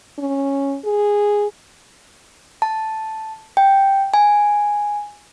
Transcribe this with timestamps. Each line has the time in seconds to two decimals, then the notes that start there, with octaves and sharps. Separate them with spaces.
0.18 C#4
0.85 G#4
2.62 A5
3.57 G5
4.14 G#5